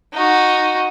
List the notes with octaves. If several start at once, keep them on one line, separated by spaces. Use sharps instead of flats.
D#4 F#4